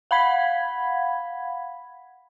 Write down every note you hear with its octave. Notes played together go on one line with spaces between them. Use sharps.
F5 F#5 B5 G#6 B6